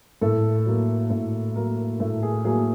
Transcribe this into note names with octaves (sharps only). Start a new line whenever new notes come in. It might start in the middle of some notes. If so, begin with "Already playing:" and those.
A2 A4
F#3 A#3
A2
F#3 A#3 A#4
A2 A4
G#4
F#3 A#3 G#4